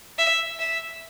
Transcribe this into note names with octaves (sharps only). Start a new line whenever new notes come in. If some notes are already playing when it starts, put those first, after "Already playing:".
E5
E5